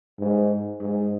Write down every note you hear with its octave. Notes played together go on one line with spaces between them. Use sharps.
G#2
G#2